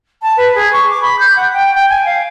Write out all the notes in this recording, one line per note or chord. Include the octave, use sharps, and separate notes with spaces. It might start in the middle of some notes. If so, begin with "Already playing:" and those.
A5
B4
G#4
C#6
D6
B5
G6
F#5
G5
G5
G#5
F5